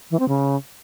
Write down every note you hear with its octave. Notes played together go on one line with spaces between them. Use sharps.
E3
C4
C#3